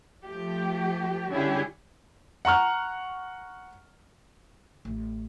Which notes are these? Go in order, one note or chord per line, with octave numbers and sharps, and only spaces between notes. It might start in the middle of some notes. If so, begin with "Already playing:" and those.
F3 A3 G4
D3 G3 C#4 E4 G4 G#4
F#5 A#5 C#6 F6
A1